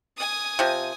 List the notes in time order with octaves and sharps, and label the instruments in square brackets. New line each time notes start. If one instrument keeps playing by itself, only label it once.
[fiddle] G#5 D#6
[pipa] C3 F3